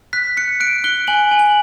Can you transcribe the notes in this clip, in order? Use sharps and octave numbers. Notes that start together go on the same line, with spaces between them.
F#6 B6
F#6 C#7
F#6 D7
F#6 G7
G#5 F#7
G#5
F#7